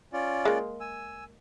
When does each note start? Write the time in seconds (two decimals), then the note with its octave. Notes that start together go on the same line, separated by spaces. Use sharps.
0.13 C#4 F4 D5
0.45 G#3 A#3
0.81 G#5 E6